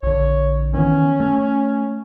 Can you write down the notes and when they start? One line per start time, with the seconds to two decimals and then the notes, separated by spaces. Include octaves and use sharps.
0.03 A#1 D3 C#5
0.74 D#3 E3 B3 C#4
1.20 A3